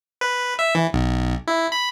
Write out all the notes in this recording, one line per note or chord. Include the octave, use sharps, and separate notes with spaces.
B4
E5
E3
B1
E4
B5